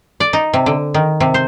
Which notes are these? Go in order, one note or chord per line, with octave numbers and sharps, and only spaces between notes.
D5
D#4
C3
D3
D#3
C3
C5